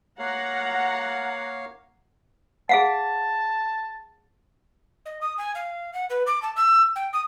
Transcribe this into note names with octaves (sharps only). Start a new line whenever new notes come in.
A#3 C#5 F5 F#5 A#5
G#4 F5 F#5 A5
D#5
D#6
G#5
F5
F#5
B4
D6
A5
E6
G5
D#6